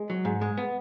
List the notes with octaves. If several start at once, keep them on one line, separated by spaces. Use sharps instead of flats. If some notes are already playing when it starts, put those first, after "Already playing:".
Already playing: G#3
F#3
G#2
G#3
B3